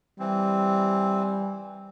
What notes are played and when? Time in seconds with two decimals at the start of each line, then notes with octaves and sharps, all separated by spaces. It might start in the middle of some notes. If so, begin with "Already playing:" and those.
0.19 E3 G3 C4